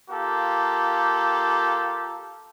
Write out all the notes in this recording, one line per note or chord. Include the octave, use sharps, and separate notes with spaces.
A#3 F4 G4 A4